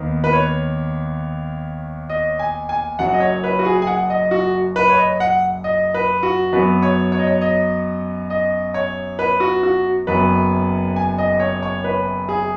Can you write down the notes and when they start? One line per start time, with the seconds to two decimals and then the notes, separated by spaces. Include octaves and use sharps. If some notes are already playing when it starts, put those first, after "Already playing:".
Already playing: D#2 D#3 B3
0.24 B4
0.33 C#5
2.10 D#5
2.39 G#5
2.69 G#5
2.99 F#1 F#2 F#3 F#5
3.14 D#5
3.20 C#5
3.44 B4
3.59 F#4
3.65 G#4
3.82 G#5
3.87 F#5
4.10 D#5
4.31 F#4
4.76 B4
4.90 C#5
4.97 D#5
5.20 F#5
5.64 D#5
5.94 B4
6.23 F#4
6.52 F#2 F#3 B3 B4
6.83 C#5
7.12 C#5
7.19 D#5
7.27 C#5
7.41 D#5
8.30 D#5
8.74 C#5
9.19 B4
9.40 F#4
9.63 F#4
10.07 F#1 F#2 F#3 B3 B4
10.96 G#5
11.18 D#5
11.40 C#5
11.63 C#5
11.84 B4
12.29 G#4